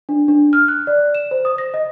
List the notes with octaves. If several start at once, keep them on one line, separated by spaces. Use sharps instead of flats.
D4
D4
F6
F#6
D5
E7
C5
D#6
A#6
D#5